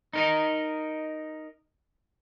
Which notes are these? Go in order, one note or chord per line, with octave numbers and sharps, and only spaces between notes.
D#4 A#4 D#5